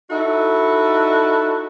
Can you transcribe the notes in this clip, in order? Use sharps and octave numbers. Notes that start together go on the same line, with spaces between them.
D#4 E4 F#4 A4